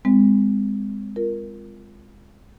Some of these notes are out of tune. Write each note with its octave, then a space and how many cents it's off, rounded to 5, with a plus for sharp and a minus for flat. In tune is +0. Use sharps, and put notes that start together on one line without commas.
G#3 -20 C4 -25
F4 -10 A#4 +5